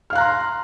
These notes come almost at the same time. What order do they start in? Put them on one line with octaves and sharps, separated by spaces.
F6 F5 F#6 A#5 C6